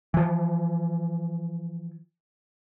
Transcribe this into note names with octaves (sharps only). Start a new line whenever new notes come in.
E3 F3